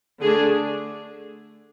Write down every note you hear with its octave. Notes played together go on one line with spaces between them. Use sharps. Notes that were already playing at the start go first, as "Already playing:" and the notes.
D3 A3 D4 G#4